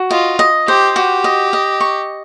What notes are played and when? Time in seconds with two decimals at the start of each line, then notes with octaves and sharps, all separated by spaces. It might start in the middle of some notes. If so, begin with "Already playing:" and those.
Already playing: F#4
0.11 F4 D#5
0.39 D#5
0.67 G4 C5
0.96 F#4 G4
1.24 D#5
1.53 D#5
1.80 C#6